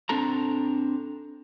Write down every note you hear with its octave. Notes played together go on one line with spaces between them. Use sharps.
C4 D4 A4 A#5